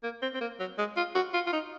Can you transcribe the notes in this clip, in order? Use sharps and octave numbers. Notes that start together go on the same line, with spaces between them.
A#3
C4
C4
A#3
F#3
G#3
F4
F#4
F4
F4
D#4